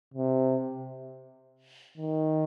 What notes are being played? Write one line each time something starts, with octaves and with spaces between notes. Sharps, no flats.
C3
D#3